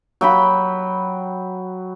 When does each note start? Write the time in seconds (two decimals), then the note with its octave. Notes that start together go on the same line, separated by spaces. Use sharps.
0.21 F#3 G5 B5